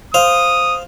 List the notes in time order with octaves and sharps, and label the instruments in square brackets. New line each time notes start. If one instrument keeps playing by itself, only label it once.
[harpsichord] C5 F5 [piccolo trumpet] D#6